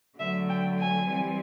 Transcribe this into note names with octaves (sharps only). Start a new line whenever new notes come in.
D3 F#3 A3 E5
G5
G#5
E3 G3 C4